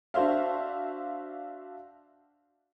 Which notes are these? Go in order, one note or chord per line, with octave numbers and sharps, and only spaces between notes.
D4 F#4 C5 E5 F5